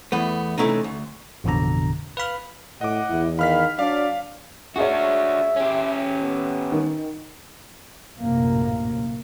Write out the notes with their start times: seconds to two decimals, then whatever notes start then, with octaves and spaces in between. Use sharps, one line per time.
0.12 E2 A3 B3
0.58 C3 E3 F3 A3 C#4 D#4
0.84 D2
1.44 A1 F2 B2 D3 A#5
2.17 B4 F5 B5 F6
2.81 A2 D#5 F#5 D6
3.10 E2 E4
3.39 D#3 F5 B5 F6 B6
3.79 F#3 D4 D5 F5
4.76 D4 F#4 G#4 C#5 E5
5.56 C#4 G4
6.22 B3
6.72 D#3
8.19 A#1 F#2 A2 C3 A#3